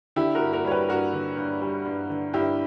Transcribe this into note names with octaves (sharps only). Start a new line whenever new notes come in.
D3 E4 G4
F#4 A#4
G2
F#4 A#4
G3 C#5
G4 B4
G2 F#4 A#4
D3
G2
G3
G2
D3
G2 E4 G4